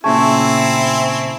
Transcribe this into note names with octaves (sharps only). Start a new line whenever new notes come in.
A#2 C#3 A3 C4 E4 G#5